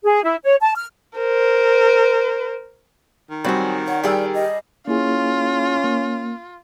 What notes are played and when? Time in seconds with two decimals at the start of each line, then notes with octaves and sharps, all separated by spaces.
0.03 G#4
0.24 E4
0.43 C#5
0.61 A5
0.76 F6
1.18 A#4 C5
3.30 D#3
3.44 F#3 G3 C4 F#4 G#4
3.88 C#4 F#5
4.03 G3 G4 G#4 A#4 D5 E6
4.34 D#5
4.87 A#3 C#4 E4 F4 G#4
5.84 A#3